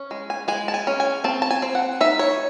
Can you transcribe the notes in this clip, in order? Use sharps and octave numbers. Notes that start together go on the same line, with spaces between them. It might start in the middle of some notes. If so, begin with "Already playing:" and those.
Already playing: C#4
G#3
G#5
G#3 G#5
A5
G#5
C#4
G#5
C4 A5
A5
G#5
C4
F#5
D#4 E5
C#5